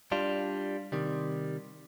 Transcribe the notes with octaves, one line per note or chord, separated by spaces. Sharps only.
G3 D4 F4
C3 D#3 G3